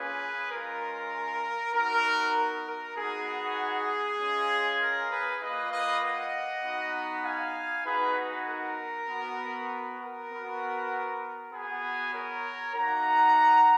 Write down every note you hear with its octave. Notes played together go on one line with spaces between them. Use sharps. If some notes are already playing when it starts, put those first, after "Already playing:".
Already playing: A#3 C#4 F4 G#4 B4
G#3 C#4 F4 A#4
B3 D#4 F#4 A#4
A#4
B3 D#4 F#4 G#4
G#3 C#4 F4
A#4
G#4 B4
A#3 F4 B4 D#5
B4 D#5
D#5 F#5
B3 D#4 F#4
F5 G#5
B3 D#4 F#4 G#4 B4
A#4
B3 F#4
A#4
B3 F#4
B3 F#4 G#4
A#4 C#5
A#3 D#4 F#4 F#5 A#5